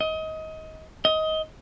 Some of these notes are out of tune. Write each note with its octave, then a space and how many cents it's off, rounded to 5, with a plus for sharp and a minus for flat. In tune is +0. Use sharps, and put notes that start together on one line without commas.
D#5 +25
D#5 +20